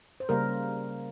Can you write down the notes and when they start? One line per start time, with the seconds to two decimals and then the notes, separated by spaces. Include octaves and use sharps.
0.20 C5
0.29 C#3 G3 A#3 A#4